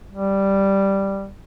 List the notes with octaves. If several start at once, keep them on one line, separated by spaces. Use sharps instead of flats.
G3